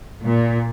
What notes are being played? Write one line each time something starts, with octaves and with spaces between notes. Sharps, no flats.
A#2